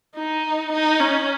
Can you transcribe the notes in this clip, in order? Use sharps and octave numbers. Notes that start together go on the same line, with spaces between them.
D#4
D#4
C#4